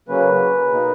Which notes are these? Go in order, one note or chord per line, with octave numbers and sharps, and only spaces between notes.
C#3 F#3 A#3 C#4 B4
B2 A#3 D#4